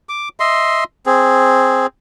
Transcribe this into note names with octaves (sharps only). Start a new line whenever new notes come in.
D6
D#5 E5 C6
C4 G#4